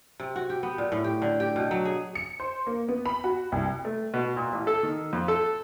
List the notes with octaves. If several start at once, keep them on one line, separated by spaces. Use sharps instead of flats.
C3
F#4
G4
B3
A#2
A2
G4
D3
G4
B2
F#3
G#4
C#7
C5
A#3
B3
B5
F#4
C2
A3
B2
A#2
A1
A4
D#3
F2
A4